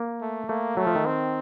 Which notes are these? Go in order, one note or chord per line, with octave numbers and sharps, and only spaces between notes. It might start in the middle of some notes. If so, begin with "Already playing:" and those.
Already playing: A#3
A3
A3 A#3
F#3 A3
F3
D#3
C4